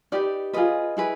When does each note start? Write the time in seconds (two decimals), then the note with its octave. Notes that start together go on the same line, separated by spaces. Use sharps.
0.12 D#4 G4 B4 D5
0.53 F4 G#4 B4 D#5
0.97 E4 G#4 B4